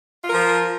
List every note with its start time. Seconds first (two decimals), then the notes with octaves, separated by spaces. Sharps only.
0.23 F4
0.28 A#4
0.32 F3